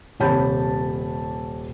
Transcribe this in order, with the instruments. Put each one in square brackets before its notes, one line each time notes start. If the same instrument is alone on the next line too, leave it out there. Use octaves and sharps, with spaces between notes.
[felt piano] D#1 C3 C#5 A5 B5 G6